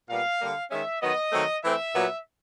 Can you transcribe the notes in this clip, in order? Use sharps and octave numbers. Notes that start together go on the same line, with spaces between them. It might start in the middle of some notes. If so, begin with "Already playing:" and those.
A#2 G3 B3 F5
D3 G3 A#3
D#3 G#3 C#4 E5
D#3 F#3 B3 D#5
D#3 F#3 A3 C4
E3 A3 C4 E5
A#2 F#3 B3